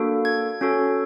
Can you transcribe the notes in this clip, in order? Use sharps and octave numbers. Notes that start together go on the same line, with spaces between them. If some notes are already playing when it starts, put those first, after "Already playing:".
Already playing: A#3 D4 F#4 A4
G#6
C#4 F#4 A4